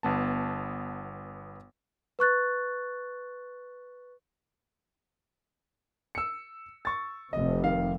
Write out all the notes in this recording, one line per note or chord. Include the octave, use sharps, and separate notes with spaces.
G1 B3 A5
B4 C#6 F#6 A6
E6 C#7
C#6 A6
F1 F2 C3 D#5
D#3 F5